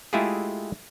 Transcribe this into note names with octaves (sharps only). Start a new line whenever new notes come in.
G#3 A3 E4 F4 G4 G#4